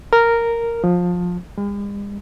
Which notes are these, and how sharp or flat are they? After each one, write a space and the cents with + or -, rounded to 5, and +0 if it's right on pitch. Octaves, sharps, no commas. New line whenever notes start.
A#4 -5
F3 +20
G#3 -45